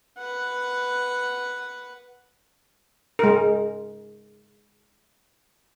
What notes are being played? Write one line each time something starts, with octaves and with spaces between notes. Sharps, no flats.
B4 F#5
G#3 A#4